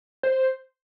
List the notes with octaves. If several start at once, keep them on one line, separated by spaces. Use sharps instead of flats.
C5